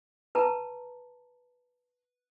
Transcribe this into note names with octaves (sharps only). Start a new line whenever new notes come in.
B4 A5 A#5